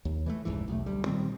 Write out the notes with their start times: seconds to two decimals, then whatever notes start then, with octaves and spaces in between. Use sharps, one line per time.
0.05 D#2
0.26 E3 G#3 A3
0.45 F1 C#2 G#2 E3
0.68 B1 E2 A3
0.86 D2 G3
1.06 A#2 D#3 G3 C4